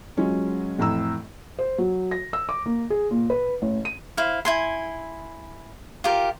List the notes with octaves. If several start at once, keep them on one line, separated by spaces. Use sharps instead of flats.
F#3 G#3 C#4 F4
F2 A2 E3 A#5 E6
C5
F#3
A#6
E6
D6
A#3
G#4
A#2
B4
A1
D#7
E4 C5 F5
E4 G#5 C6
F4 G4 A#4